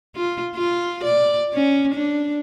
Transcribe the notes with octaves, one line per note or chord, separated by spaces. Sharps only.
F4
F4
D5
C#4
D4